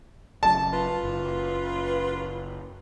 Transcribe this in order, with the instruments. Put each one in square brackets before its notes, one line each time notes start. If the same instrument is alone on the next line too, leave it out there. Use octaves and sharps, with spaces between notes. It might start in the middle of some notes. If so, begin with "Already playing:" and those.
[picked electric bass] F#1 F#2 [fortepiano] A5
[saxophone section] F4 B4
[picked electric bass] F#1